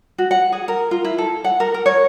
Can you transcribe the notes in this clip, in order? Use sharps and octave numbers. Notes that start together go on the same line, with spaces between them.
F#4
F#5
G#4
A#4
F4
E4
A4
F#5
A#4
A#4
C#5